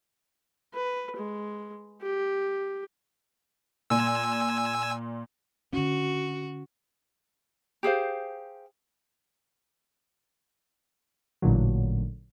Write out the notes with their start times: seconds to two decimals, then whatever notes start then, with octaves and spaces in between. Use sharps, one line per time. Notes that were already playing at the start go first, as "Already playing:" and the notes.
0.74 B4
1.17 G#3
2.02 G4
3.90 A#2 G#5 E6
5.73 D3 C#4 F#4
7.83 G4 G#4 C5 F5
11.42 A1 A#2 D3 F#3